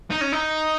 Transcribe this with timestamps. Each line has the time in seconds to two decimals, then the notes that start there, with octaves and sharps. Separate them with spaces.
0.10 D#4
0.21 C#4
0.32 D#4